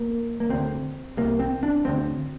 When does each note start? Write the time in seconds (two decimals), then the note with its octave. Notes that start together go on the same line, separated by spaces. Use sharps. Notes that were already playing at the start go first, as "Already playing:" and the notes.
Already playing: A#3
0.40 A#3
0.50 D2 D3 C4
1.17 C2 C3 A#3
1.40 C4
1.63 D4
1.85 D2 D3 C4